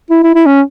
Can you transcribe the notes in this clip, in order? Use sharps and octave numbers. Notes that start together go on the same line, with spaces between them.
E4
E4
E4
C#4